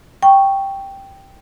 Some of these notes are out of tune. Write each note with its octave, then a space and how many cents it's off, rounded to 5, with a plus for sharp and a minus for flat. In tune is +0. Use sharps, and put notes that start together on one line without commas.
G5 +0 C#6 +0